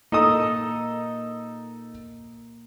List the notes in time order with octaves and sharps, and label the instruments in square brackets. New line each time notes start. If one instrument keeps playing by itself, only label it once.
[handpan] A#3 [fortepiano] D#4 A4 D#6